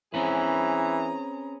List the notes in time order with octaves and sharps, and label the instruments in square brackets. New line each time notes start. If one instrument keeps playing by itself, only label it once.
[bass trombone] E3 [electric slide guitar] C4 C#4 B4 [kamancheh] G#4 A#5